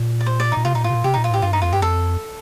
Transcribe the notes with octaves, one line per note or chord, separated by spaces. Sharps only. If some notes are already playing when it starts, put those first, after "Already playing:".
Already playing: A#2
D5
C5
D5
D#4
A#2
C3 F4
A#2 D#4
A2 F4
C3
A#2
C3 G4
A#2 D#4
F4
A2 G4
G2 F4
D#4
F2 F4
G2 G4
F2 A4